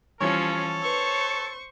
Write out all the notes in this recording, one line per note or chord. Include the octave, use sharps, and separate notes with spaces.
E3 F3 G3 C#4 A4 C#5
B4 C5 C#6 E6